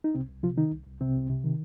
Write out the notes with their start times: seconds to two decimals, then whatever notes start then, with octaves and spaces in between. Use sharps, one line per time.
0.04 D#4
0.15 C2 C3 C4
0.29 C2
0.43 C3 F3 F4
0.57 D#3 D#4
0.72 C2
0.86 C2
1.01 C2 C3 C4
1.15 C2
1.30 C3
1.44 D#3